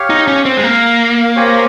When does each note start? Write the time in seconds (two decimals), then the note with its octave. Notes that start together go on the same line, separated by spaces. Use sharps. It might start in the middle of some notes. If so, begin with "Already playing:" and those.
Already playing: G4 C#5 F5
0.10 D#4
0.28 C#4
0.46 C4
0.57 G#3
0.63 A#3
1.36 C4 G4 C#5 G#5